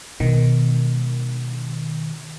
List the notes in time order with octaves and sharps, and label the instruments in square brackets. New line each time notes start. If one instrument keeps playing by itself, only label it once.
[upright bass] B2 G#3 [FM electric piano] D#3